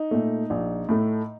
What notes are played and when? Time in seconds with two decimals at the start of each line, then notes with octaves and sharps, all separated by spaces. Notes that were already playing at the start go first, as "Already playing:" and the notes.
Already playing: D#4
0.11 A#2 A3
0.50 A#1
0.89 A2 A3